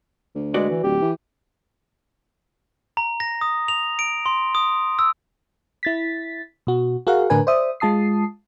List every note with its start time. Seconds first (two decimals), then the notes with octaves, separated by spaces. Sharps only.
0.35 D2
0.54 G#3 F#4 B4 D5
0.70 E3
0.83 D1 G4
1.02 E3
2.97 A#5
3.20 A#6
3.41 D#6
3.68 F7
3.99 D7
4.26 C6
4.55 D#6
4.99 E6
5.83 E4 A6 B6
6.67 B2 F#4
7.07 F#4 G#4 A#4 F5 F#5
7.30 A2 D3 D4 A#4 B4 G#5
7.47 C5 D5 E5 D#6
7.80 G#3 F4 A5 D#6 C7